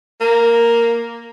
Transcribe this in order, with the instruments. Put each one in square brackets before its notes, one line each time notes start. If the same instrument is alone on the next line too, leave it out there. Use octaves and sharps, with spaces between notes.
[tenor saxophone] A#3